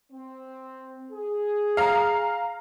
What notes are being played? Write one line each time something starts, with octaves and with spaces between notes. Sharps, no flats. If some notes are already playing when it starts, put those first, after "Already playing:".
C4
G#4
F5 A#5